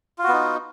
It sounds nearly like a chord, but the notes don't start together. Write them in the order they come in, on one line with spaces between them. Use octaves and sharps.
F4 F#4 B3 D#4